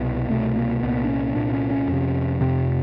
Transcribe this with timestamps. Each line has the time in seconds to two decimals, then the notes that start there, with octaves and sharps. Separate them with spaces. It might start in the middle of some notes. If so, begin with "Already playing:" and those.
Already playing: C2 B2
0.29 C2 B2 A3
0.56 A#3
0.83 C2 A#2 B3
1.04 D4
1.09 C#4
1.35 C2 A#2 D4
1.53 C#4
1.71 C#4
1.88 F2 C3
2.41 F2 C3 C4